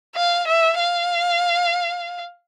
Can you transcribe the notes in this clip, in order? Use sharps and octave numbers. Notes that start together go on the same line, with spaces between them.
F5
E5
F5